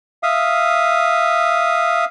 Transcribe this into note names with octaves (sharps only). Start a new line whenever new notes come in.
E5 F5 D#6